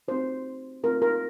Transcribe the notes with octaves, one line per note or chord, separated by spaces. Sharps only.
A3 C4 D#4 F#4 C5
A3 C4 F4 A#4
A#4